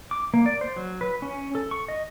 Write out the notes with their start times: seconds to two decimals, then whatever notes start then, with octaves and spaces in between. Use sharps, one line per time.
0.11 D6
0.34 A#3
0.46 D5
0.61 C5
0.76 F#3
1.01 B4
1.22 C#4
1.55 A4
1.71 C#6
1.88 D#5